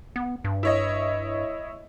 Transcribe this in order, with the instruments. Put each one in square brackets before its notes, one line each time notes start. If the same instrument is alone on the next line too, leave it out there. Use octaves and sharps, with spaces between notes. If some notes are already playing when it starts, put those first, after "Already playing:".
[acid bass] B3
G2
[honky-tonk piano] E4 C#5 D#5